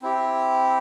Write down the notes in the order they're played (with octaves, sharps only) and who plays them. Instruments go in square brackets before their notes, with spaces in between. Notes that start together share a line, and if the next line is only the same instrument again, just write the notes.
[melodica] C4 E4 G4